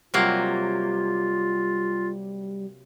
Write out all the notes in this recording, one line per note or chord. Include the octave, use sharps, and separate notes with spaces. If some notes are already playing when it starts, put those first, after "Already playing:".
C3 F#3 G3 A#3 F4